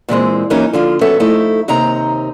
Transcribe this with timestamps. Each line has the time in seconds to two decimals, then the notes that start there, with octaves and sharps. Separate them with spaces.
0.09 A#2 E3 G#3 C4
0.50 E3 F#3 A#3 C#4 D#4
0.73 D3 F3 F4
1.01 F#3 B3 C#4 A4 E5
1.20 F3 A3 D#4 E4 A4
1.68 D#2 C3 C4 D#4 A#5